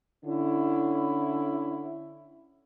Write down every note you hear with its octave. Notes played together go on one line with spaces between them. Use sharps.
D3 C#4 E4